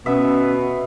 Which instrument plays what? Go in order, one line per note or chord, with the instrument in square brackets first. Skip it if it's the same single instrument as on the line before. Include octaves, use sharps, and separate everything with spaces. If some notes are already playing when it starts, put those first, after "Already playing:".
[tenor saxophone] B2 [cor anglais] B3 [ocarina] C#4 [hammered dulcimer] E5